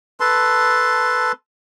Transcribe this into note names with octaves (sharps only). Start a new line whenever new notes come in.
A4 B4 A5 C6